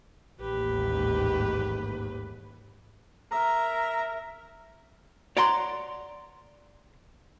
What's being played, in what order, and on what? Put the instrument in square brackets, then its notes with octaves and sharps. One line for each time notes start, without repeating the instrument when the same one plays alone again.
[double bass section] A1 D#2 G#2 [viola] G4 B4
[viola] A#4 E5 [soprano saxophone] A#5
[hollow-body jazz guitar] C#5 D5 F#5 A#5 C6